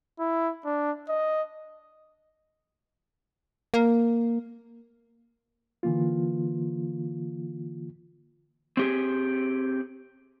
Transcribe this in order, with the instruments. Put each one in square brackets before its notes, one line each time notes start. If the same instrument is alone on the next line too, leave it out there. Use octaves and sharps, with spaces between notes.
[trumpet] E4
D4
D#5
[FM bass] A#3
[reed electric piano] D3 E3 A#3 F4
[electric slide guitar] C4 G4 G#4